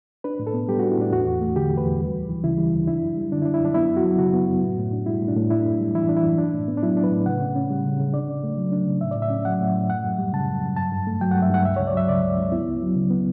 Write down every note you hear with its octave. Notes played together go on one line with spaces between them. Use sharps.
D4 B4
A2
A4
B3
G3 G4
F#4
D4
E4
A2 D4
E2 F#4
E2
A3
D3 G4
E2
B4
E2
G3
D2
E3
C#3 E4
G3
D2
D4 E4
F#2
G3
D3 D4
E4
D4
E4
F#2 D4
B3 E4
F#2
F#4
F#3
C#3 F#4
B3
F#2
A2
A2
D4
G3 E4
A2
D4
A2
D4 E4
F#2
G3
E3 E4
D4
E4
F#2
D4
A2
B3
D4
F#3 E4
D4
B4
A2
C#3 F#5
C#3
C#4
G3
C#3
C#3
D4 D5
C#3
A3
F#3
D4
C#3
A2 E5
A2 D5
E5
C#4
F#3 F#5
A2
A2
F#2 F#5
F#2
G3
C#3 A5
F#2
F#2
G2 A5
G2
A3
F#3 G5
G2 F#5
E5
G2 F#5
C#2 E5
C#5
C#2
D5
F#3 E5
C#3 D5
C#2
C#2
B3 E4
C#2
F#3
C#3
B3